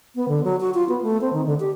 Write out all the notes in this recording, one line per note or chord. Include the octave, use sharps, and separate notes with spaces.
B3
D3
F#3
F#4
F4
B3
A3
C4
D#3
D3
G4